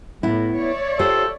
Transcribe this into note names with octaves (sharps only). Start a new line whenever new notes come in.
A2 B3 E4
C#5 D5 E5
F4 G4 A4 C5